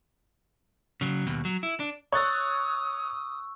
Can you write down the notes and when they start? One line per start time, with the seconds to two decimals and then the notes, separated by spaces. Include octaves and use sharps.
1.01 C#3 F#3
1.27 D#2 B2
1.45 F#3
1.63 E4
1.80 D4
2.12 C#5 C#6 D#6 E6 F#6 A6